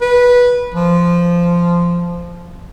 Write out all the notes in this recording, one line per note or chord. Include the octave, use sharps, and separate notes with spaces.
B4
F3